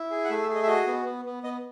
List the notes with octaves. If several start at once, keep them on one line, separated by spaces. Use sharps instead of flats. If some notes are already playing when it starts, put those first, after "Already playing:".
Already playing: E4
G#4
F#5
A3 E5
E5
G#4
D#5
E5
F#4 D#5
B3
B3
B3
B3 D#5